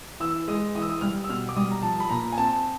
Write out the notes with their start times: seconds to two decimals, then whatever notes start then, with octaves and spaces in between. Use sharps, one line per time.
0.20 E3 E6
0.48 G#3 D#6
0.75 E3 D#6
0.82 E6
0.89 D#6
1.01 G3 F6
1.24 E6
1.29 B2 F6
1.49 D6
1.56 G3 D#6
1.72 A#5
1.82 F3 A5
2.00 B5
2.10 A#2 A#5
2.33 G#5
2.38 C4 A5